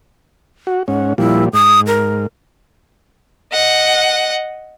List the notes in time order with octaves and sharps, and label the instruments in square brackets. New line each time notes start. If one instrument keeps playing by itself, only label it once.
[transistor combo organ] F#4
[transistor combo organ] G#2 C#4 [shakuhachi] F#5
[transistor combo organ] A#2 F3 G3 [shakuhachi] E4
[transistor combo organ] G#2 [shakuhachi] D#6
[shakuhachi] A#4
[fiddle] D#5 F#5